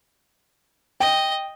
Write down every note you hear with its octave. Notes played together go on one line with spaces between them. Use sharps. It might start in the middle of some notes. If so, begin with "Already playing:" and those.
D#5 G5